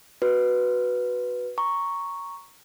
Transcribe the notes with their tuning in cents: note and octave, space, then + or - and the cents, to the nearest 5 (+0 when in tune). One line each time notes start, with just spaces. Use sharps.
F#4 +0 B4 +0
A#5 +0 C#6 +0